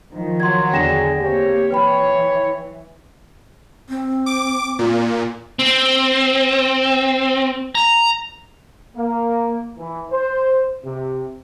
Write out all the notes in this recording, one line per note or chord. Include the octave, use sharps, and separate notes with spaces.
D#3 F3
F#3 C6 G#6
E2 D3 G#4 G5 A#6 E7
A#3 C4 G4 C#5
E3 B4 C#5 G5 B5
C4
D6
A#2
C4
A#5
A#3
E3
C5
C3